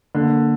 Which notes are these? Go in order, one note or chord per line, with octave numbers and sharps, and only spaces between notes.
D3 A#3